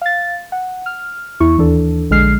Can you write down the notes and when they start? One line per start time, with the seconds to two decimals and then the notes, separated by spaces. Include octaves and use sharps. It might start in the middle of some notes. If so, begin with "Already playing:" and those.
0.02 F5 A6
0.52 F#5
0.86 F6
1.40 E2 E4 C#6
1.58 D#2 E3 D4 A4
2.10 A#1 D3 G#3 F6 C7